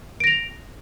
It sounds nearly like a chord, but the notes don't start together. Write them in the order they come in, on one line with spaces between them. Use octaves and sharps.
D7 A#6 F7